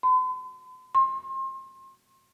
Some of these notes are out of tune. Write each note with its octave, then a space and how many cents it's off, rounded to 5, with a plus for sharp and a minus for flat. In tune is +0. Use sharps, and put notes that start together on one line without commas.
C6 -45
C6 +30